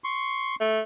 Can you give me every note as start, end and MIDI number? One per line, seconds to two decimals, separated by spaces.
0.04 0.56 84
0.04 0.56 85
0.61 0.81 57